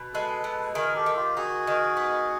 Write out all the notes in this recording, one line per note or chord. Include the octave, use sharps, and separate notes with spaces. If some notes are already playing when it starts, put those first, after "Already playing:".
Already playing: B2
G#3 A4 B4
B2
D#3 G#4 A#4
G4 A4
D#3
F4 G4
D#4 F#4 G#4
D#3
B3